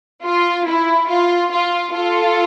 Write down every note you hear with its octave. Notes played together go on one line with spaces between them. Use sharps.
F4
E4
F4
F4
F4 A4